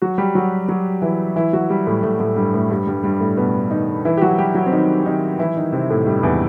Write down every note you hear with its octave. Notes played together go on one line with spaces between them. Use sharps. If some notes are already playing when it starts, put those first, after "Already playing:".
F#3 F#4
G3 G4
F#3 F#4
F#3 F#4
E3 E4
E3 E4
F#3 F#4
G3 G4
A2 A3
A2 A3
A2 A3
G2 G3
A2 A3
G2 G3
G2 G3
G2 G3
A2 A3
B2 B3
D#3 D#4
E3 E4
G4
F#3 F#4
G3 G4
F#3 F#4
C4
D#3 D#4
D#3 D#4
E3 E4
D#3 D#4
C3 C4
A2 A3
G2 G3
E2 E3